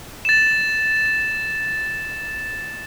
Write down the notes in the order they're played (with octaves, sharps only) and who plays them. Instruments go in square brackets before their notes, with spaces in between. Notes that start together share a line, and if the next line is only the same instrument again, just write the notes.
[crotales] A6 E7